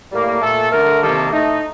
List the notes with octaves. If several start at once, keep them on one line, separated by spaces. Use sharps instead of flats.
A2 G3 A#3
A#2 A3 A4
D3 A3 A#4
C3 D#3 G3 A#3 A4
A2 A3 D#4